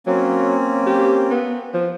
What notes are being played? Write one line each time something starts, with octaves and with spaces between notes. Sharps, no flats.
F#3 A#3 C4 C#4
G4
B3
F3